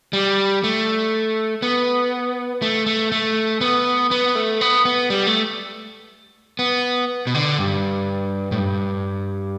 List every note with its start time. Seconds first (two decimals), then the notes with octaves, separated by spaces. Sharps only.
0.13 G3
0.64 A3
1.62 B3
2.62 A3
2.86 A3
3.12 A3
3.61 B3
4.11 B3
4.35 A3
4.61 B3
4.85 B3
5.10 G3
5.27 A3
6.59 B3
7.27 B2
7.35 D3
7.59 G2
8.52 A2
8.58 G2